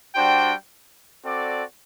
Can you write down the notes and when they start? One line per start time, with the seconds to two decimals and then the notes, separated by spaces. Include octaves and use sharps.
0.15 G3 D4 F#4 C5 G5
1.24 C4 F#4 A4 D5